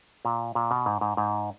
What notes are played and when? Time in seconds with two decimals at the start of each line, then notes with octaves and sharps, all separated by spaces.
0.25 A#2
0.55 A#2
0.71 B2
0.86 G#2
1.01 G#2
1.17 G#2